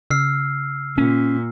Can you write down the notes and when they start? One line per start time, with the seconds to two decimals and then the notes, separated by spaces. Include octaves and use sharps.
0.10 C#3 E6 F6 C7
0.98 A#2 C#4